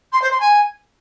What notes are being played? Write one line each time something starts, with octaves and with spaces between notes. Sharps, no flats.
C6
C5
C6
G#5